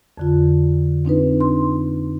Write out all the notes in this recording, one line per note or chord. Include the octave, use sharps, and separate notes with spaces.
F2 D3 F4
C4 D4 D#4 B4
C6